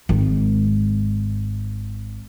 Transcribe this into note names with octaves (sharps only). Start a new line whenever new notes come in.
G#1 G#2